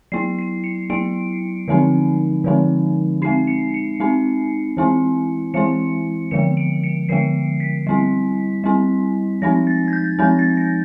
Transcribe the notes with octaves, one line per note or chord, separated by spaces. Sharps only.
F#3 B3 E4 C7
C7
C#7
F#3 B3 E4 D7
D3 F3 G#3 C4 D#4
D3 F3 G#3 C4 D#4
G#3 C4 D#4 C7
C#7
C#7
G#3 C4 D#4
E3 G#3 C4 E4
E3 G#3 C4 E4 C#7
D3 F3 G#3 B3 C#7
D7
C#7
D3 F3 G#3 B3 C7
B6
G3 C4 E4
G3 C4 E4
F3 G#3 C4 D#4 A#6
A6
G#6
G6
F3 G#3 C4 D#4 G6
A6
A#6